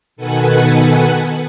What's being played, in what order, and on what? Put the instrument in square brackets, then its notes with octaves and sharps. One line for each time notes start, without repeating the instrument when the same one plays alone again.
[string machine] B2 D#3 A4 B4 F#5 G#5